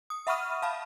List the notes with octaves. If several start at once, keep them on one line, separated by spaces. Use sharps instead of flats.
D#6
E5 F#5 B5 C#6 F6 D#7
F5 A5 B5